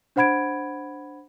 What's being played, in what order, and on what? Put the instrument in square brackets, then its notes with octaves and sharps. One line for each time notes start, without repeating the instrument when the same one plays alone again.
[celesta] D4 C5 F#5 B5 G#6 D7